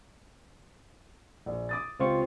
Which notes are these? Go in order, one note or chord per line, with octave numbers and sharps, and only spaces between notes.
A#1
D6 D#6 A6
C#2 C4 F4 G4 C#6